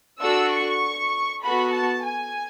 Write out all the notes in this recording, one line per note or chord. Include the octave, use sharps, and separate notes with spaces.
D4 F#4 A4 E6
C#6
B3 F#4 A4 B5
A5
G#5